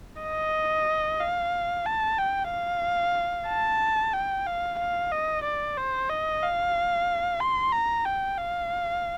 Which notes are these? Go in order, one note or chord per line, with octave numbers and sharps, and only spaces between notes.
D#5
F5
A5
G5
F5
A5
G5
F5
F5
D#5
D5
C5
D#5
F5
C6
A#5
G5
F5